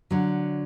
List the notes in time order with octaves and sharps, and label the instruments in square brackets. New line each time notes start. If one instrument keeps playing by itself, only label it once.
[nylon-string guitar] D3 F#3